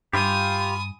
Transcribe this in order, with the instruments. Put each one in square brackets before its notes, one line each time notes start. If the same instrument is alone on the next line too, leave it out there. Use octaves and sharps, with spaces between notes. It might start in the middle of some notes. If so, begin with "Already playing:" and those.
[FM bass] G2 [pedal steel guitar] F4 G4 [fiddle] G#5 D#6 [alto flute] B5